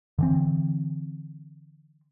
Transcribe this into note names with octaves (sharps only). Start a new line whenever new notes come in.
D3 E3 C4